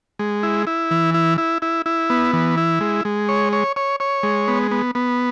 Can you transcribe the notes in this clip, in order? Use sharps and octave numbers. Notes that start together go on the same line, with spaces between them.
G#3
E4
E4
E3
E4
E4
E4
E4
B3
E3
E4
G#3
G#3
C#5
C#5
C#5
C#5
G#3
B3
B3
B3